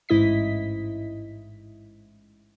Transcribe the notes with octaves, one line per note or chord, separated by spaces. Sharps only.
A1 G#2 E4 D#5 B6